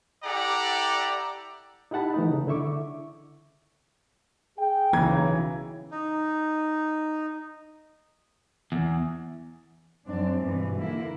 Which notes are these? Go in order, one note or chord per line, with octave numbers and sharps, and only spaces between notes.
E4 G4 A4 D5 F#5 A#5
D#4 E4 G4 F#5 A5 B5
E3 A3 D#4
C#3
D3 E4 E5 C#6 D6
G#4 G5
B1 C#3 E3 A#5 G#6
D#4
E2
F#2 C4 D4
G2 B2 E3
D3 A#3 E4